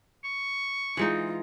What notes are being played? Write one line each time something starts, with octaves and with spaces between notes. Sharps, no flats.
C#6
E3 G#3 D#4 F4